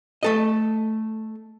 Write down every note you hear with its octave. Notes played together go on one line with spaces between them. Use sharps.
A3 A4 D#5